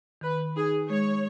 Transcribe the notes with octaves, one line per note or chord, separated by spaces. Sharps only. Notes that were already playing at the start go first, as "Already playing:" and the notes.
D#3 B4
D#4 G#4
G#3 C#5